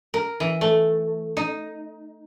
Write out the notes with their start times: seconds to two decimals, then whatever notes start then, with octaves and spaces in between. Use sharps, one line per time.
0.14 A#4
0.40 E3
0.61 A3
1.37 D#4